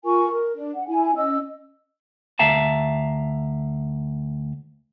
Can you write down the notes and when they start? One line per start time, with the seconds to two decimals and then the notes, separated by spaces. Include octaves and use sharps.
0.05 F4 A#4 G#5 C#6
0.31 A#4
0.54 D4
0.75 F#5
0.88 E4 G#5
1.16 C#4 D#5 E6
2.39 D2 E5 F5 A5 A#5